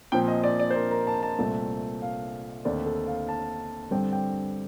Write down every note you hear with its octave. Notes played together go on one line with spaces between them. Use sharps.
A#2 F3 C4 G5
D#5
D5
D5
C5
A#4
A#4
A5
A5
C2 A#2 A3 C4
F5
D#2 D3 A3 C4 D5
A4
F5
A5
G2 D3 G3 C4 G5
G5